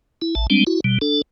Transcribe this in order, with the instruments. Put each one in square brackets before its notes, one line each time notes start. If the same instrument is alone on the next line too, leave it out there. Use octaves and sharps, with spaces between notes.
[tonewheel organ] E4
A1 A5
G3 G#3 C4 D4
E4 F#4
B2 G3
D4 A4